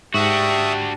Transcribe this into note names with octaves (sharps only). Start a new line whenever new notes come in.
G#2 D4 F#4 G4 E5 C#6 D#6